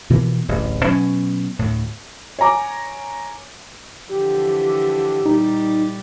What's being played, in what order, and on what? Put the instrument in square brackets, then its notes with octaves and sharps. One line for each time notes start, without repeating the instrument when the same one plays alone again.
[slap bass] B2 E3 F3 A#3
D1 A1 E2
B2 F#3 C#4
D2 A2
[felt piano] C#5 G#5 A#5 D6
[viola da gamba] D3 E3 F3 [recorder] G4
[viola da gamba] A#2 G3 [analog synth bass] D#4